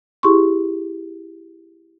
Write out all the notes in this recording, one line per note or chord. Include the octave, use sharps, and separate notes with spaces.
E4 G4 G#4 C6 C#6